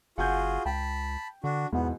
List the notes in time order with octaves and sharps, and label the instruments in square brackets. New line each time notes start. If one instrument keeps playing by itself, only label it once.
[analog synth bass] F#1 [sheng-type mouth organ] F4 F#4 G#4 [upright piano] F#5 G#5 G6
[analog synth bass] C#2 [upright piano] G5 [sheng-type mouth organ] A5 B5
[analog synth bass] D3 [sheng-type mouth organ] D4 F#4
[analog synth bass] E2 [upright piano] G#2 B2 E3 [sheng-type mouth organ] B3